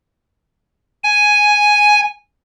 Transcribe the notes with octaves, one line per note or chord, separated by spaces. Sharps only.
G#5